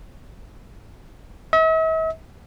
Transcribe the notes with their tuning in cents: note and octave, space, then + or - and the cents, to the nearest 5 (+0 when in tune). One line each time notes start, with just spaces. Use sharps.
E5 -45